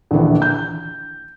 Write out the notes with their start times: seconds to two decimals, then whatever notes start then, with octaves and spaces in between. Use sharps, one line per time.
0.11 A#1 D#2 D3 E3
0.42 G6